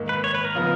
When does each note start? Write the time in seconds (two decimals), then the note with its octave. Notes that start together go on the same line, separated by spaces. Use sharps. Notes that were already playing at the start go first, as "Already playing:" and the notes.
Already playing: G#2 D#3 A#3
0.09 B4
0.24 C#5
0.35 B4
0.45 A#4
0.55 C#3 F3 B3